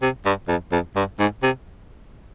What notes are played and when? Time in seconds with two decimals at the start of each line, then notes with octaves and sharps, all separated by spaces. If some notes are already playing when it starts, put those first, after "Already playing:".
0.02 C3
0.25 G2
0.48 F2
0.72 F2
0.96 G2
1.19 G#2
1.43 C3